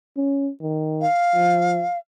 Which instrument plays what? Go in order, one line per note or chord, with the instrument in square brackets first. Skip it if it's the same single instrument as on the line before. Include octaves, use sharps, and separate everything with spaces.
[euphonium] C#4
D#3
[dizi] F5
[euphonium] F3